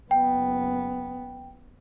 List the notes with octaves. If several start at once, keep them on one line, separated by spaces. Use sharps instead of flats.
F#1 B3 G5